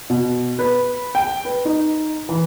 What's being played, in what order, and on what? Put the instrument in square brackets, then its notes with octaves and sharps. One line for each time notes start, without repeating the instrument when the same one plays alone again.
[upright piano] B2
B4
G5
B4
D#4
E3